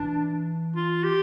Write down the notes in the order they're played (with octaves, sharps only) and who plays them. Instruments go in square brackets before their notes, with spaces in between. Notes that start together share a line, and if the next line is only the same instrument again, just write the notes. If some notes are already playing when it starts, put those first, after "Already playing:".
Already playing: [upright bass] E3 [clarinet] D4
[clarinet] F4
G4